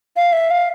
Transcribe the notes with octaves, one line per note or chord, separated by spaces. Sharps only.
F5
E5
F5